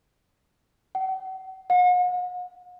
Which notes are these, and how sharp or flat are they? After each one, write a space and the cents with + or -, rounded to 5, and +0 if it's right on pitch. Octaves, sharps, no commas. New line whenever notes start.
F#5 +40
F#5 -45